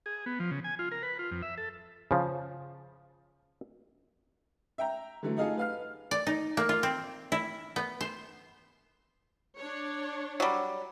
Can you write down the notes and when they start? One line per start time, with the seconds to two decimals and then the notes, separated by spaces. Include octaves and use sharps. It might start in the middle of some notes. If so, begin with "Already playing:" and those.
0.06 G#4
0.26 B3
0.40 F3
0.51 C#3
0.64 G#5
0.79 F4
0.92 A#4
1.03 B4
1.19 F4
1.31 F2
1.42 E5
1.58 A4
2.11 C#3 F3
4.78 E5 G5 A#5
5.23 D3 E3 F#3 A3
5.37 A3 D#4 F4 G#4 A4
5.57 B4 F5 F6
6.11 D5
6.27 D#4
6.57 A#3
6.69 F4
6.83 C4
7.32 E4
7.76 B3
8.01 C5
9.59 D4 C#5
10.40 F#3 G3